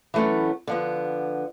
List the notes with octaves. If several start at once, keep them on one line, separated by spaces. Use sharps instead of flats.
E3 F#3 A3 B3 C#4
D3 F3 B3